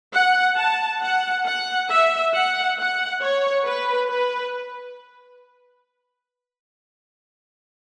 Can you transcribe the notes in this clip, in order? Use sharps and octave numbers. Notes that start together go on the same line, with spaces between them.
F#5
A5
F#5
F#5
E5
F#5
F#5
C#5
B4
B4